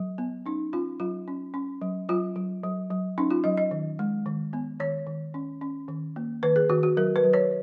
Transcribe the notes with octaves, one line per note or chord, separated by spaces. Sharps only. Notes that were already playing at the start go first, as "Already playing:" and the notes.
Already playing: F#3
B3
C#4 D#4
C#4 F4
F#3 F4
C#4
C#4
F#3
F#3 F4
F#3
F#3
F#3
C#4 D#4
F4
F#3 D#5
D#5
D#3
G#3
D#3
B3
D#3 C#5
D#3
C#4
C#4
D#3
A#3
D#3 B4
G#4
D#3 F#4
F#4
F#3 A#4
B4
F#3
C#5